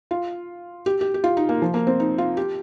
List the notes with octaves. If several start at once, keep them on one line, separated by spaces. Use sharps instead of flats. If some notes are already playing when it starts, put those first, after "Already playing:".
F4
G4
G4
G4
F4
D#4
A#3
F3
A#3
C4
D#4
F4
G4